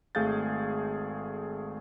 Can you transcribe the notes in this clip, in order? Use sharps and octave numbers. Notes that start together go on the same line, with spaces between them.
G#1 A3 G#4 F5 G6 A6